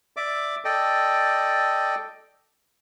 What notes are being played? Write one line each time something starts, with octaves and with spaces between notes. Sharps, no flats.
D5 E5 D6
A4 D5 D#5 G5